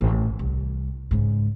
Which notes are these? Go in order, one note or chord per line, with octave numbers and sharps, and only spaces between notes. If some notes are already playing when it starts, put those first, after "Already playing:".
A1
C2
G#2 C#3